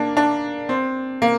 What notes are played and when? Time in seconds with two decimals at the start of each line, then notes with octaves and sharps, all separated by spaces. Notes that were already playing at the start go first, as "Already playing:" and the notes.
Already playing: A#3 D4
0.17 D4
0.69 C4
1.22 A#3